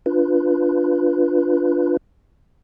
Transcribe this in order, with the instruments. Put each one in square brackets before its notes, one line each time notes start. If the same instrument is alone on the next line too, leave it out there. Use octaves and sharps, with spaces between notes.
[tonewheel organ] D4 F4 B4